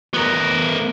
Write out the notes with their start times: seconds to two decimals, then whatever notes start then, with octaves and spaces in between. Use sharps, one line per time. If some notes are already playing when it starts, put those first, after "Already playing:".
0.14 B3 A#4